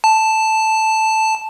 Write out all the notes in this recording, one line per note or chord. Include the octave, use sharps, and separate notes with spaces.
A5